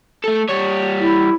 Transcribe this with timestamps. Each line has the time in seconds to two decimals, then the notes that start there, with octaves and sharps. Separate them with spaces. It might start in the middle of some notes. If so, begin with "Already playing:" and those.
0.24 A3 A4
0.49 G3 C#5
1.00 E4